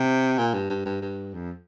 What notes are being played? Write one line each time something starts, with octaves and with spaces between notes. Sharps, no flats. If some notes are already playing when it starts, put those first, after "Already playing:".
Already playing: C3
A#2
G2
G2
G2
G2
F2